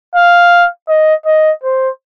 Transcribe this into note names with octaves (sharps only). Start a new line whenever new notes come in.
F5
D#5
D#5
C5